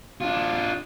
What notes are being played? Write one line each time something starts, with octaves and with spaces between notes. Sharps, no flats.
D4 F4